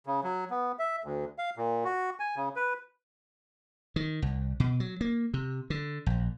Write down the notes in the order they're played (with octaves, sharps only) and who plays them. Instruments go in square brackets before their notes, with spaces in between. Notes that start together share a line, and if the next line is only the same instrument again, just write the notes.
[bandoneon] C#3
F#3
B3
E5
D2
F5
A#2
F#4
G#5
C#3
B4
[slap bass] D#3
C2
B2
F#3
A#3
C3
D3
A#1